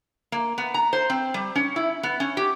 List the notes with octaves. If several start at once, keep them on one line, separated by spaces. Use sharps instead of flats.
A#3
B3
A#5
C5
C4
G3
C#4
E4
B3
C#4
G4